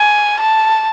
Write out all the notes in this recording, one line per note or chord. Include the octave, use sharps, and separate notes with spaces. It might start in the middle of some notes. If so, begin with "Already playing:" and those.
Already playing: G#5
A5